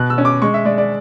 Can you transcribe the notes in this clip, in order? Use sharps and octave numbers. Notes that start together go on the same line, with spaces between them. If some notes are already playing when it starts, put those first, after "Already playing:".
Already playing: B2 F#6
E6
C#4
D6
G#3 C#6
E5
G#3 D5
D5